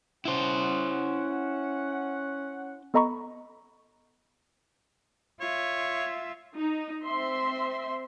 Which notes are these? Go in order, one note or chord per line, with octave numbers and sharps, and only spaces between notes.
C#4 E4 C5 F#5
B3 A4 D#5 A#5 B5 C#6
F4 C#5 E5
D#4
C4 E5 C6